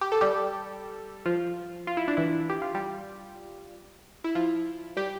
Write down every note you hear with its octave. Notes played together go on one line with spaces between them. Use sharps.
G4
A4
G3 G4
F3 F4
F4
E4
D4
E3 E4
G4
F4
G3 G4
E4
F3 F4
G3 G4